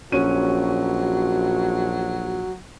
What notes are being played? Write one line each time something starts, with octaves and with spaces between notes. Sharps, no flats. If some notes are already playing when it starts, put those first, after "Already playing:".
A#1 F#3 C#4 F#4 D#7